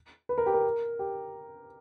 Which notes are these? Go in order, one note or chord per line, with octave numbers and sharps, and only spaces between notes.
B4
A#4
G4
A#4
G4